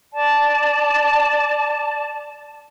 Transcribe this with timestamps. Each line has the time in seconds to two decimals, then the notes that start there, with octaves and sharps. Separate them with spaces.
0.13 D5 A5